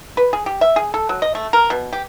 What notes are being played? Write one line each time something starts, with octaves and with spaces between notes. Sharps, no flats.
B4
G#4
G4
E5
G#4
A4
F#3
D#5
A3
A#4
B2
G4